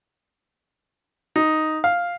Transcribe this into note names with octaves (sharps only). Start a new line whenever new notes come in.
D#4
F5